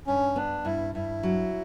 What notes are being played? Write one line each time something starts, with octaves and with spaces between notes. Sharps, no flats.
G2 C#4
B3 D4
G2 E4
G2 E4
F#3